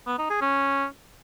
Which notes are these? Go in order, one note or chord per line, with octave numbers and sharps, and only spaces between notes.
B3
D#4
G#4
C#4